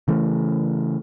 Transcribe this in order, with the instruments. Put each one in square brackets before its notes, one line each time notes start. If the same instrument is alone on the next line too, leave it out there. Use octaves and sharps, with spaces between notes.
[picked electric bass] C#3 E3 A3